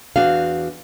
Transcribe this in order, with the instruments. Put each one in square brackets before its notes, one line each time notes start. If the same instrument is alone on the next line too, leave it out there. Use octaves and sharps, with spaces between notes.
[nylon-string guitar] E2 D4 F#4 [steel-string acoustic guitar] F5